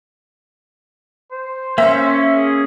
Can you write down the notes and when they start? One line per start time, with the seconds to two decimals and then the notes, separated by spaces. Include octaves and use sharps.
1.32 C5
1.78 A#3 C#4 E5
2.36 G#4